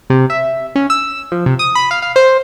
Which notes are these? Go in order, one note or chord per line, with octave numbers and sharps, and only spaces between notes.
C3
E5
C#4
E6
F3
C3
D#6
B5
F5
F5
C5